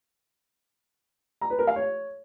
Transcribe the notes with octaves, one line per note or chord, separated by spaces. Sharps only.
A#5
B4
A#4
F5
C#5